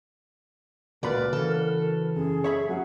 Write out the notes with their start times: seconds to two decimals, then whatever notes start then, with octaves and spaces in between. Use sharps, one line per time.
1.03 C#2 A#2 F#4 A#4 B4 D5 B5
1.33 C#3 E3 A4
2.16 F#2 G#4
2.44 C#5 E5 B5
2.69 F#3 C#4 G#4 F#5